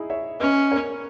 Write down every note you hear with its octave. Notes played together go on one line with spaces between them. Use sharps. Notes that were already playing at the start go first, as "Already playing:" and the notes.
Already playing: D#4 E4 G#4
C#5 E5
C#4 B4 D#5
A#4 C#5